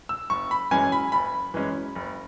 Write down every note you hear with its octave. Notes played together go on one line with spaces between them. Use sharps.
E6
F#1 C#6
B5
F#2 E3 G#3 C#4 G#5
B5
F#1 B5
F#2 E3 G#3 C#4
F#1